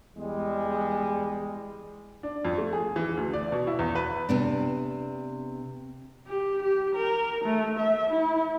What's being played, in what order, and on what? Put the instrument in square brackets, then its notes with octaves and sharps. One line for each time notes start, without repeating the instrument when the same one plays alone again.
[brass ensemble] E2 G3 G#3
[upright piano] D4
F2
A3
G#4
E3
D2
D5
B2
E4
E2
B4
[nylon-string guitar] C3 B3 D4
[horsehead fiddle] G4
G4
A#4
A3
E5
E4